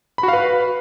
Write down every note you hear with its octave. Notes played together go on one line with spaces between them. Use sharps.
B5
F#4
F5
B4